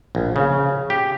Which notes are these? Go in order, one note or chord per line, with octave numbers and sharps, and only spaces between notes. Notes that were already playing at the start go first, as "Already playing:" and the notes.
A#1
C#3
G4